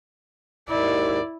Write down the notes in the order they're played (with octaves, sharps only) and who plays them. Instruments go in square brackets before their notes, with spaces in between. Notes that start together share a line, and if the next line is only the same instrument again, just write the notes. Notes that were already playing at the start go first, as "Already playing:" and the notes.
[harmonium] D#2 G#2 D#3 [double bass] E4 [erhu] D5